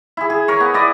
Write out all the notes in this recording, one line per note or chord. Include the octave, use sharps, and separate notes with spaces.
E4 G#4
G#4
A#4 C#5
B3
E4 D5 D#5